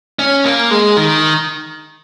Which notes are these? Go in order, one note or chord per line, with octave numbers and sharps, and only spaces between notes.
C#4
A#3
G#3
D#3